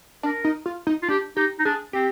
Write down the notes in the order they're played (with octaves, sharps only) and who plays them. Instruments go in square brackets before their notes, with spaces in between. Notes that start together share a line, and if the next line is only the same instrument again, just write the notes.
[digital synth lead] D4 [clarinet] A#4
[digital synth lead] D#4
F4
D#4
[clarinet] F4
[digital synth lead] D4 [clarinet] G4
[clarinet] D#4 [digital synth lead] G4
[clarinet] D#4
[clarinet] D4 [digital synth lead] G#4
[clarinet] C4 [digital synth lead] G4